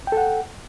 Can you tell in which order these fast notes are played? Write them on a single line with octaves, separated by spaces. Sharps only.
G5 A4 F#5